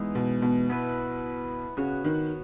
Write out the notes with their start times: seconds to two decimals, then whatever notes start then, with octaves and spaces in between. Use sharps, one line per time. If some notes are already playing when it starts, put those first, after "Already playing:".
Already playing: E3 G#3 B3 D#4
0.15 B2
0.42 B2
0.70 B3 E4 B4
1.77 C#3 B3 F#4 C#5
2.04 D#3